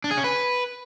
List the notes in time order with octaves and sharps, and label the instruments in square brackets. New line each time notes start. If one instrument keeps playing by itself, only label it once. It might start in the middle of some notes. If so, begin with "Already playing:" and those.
[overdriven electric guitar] D4
G#4
C#4
B4